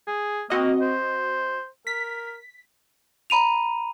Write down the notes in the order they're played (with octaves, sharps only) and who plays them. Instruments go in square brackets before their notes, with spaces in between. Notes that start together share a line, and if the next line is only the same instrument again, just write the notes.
[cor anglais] G#4
[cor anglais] A#3 [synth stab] C4 F#4 D#5
[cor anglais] C5
[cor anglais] A#4 [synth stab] B6
[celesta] A#5 B5 D#7 F7